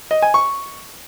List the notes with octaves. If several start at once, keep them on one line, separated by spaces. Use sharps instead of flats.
D#5
G#5
C#6